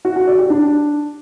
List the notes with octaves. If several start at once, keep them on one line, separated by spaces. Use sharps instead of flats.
F#4
F#4
D5
G4
D4